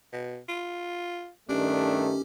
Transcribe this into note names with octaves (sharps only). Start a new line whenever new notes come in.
B2
F4
G2 D#3 A3 C#4 D4 G4